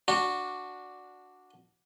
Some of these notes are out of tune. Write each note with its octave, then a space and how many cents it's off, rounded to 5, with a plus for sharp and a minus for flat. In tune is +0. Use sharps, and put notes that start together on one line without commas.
D4 -5 F#4 -10